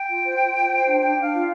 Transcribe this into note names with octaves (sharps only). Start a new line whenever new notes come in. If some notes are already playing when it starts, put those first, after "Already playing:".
Already playing: G5
F4
C5
F4
F4
C5
D4
D4 G5
D4 F5
F4